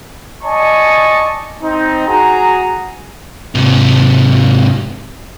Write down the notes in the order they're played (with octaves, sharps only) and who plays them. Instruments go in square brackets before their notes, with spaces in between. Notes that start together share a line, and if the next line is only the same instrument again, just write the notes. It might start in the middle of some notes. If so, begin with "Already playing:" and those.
[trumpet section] D5 D#5 G#5 A5 C#6
C4 D#4
F#4 G#4 A#5
[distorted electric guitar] G#2 C3